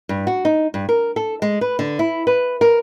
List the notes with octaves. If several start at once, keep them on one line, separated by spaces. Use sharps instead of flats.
G2
F#4
D#4
G2
A#4
A4
G#3
B4
D3
E4
B4
A#4